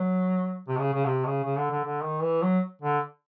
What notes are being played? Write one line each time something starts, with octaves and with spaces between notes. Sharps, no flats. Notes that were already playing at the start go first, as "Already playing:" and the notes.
Already playing: F#3
C3
C#3
C#3
C3
C#3
C#3
D3
D3
D3
D#3
E3
F#3
D3